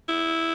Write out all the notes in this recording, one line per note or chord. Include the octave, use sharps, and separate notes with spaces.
E4